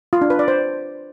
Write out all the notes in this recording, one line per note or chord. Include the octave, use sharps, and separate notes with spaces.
F4
D4
B4
D5
C5